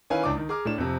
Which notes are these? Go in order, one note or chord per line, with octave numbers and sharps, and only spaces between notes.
D#3 C#4 E4 B4 F5 G#5
C#2 D4 E4 D6
D#3
G#4 A#5 D6 F6
A2 D4 E7
F2 C3